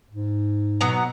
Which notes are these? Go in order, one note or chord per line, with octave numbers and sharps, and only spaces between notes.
G#2
B2 F#3 B3 A#5